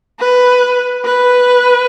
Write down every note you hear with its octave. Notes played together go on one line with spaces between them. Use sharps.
B4
B4